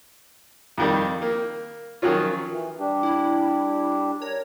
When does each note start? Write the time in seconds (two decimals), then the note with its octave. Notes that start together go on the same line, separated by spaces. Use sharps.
0.78 F2 D#3 G3
1.22 A#3
2.02 D#3 F3 F#3 C#4 F4
2.50 E3
2.79 G3 D4 G4
3.03 E4
4.22 A#4 C#5